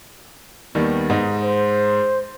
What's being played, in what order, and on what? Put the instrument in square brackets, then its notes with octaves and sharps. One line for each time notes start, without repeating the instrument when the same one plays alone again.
[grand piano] D#2 D#3 G3 [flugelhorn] B3
[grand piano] G#2 D#4
[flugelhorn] C5